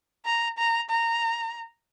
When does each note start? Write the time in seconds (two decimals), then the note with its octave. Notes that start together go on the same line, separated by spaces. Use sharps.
0.26 A#5
0.58 A#5
0.90 A#5